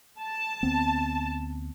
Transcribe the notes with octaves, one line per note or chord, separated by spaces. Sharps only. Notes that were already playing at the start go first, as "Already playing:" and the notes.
A5
D2 B3 C4